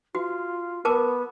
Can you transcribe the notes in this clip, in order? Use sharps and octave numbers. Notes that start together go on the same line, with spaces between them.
F4 F#4
B3 A#4 A5 D6